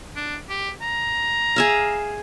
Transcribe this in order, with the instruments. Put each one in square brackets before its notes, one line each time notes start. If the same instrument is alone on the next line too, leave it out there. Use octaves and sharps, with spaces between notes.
[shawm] D4
G4
A#5
[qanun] G#4 E5 F5